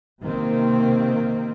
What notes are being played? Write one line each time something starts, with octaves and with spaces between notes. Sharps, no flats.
C3 D#3 A#3 C4